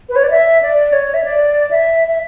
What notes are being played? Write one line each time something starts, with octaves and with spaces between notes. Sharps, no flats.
B4
C#5
D5
E5
D5
C#5
E5
D5
E5
E5